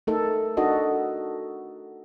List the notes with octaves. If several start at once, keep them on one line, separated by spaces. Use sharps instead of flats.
A3 D#4 A4 A#4
D4 D#4 F#4 A4 D#5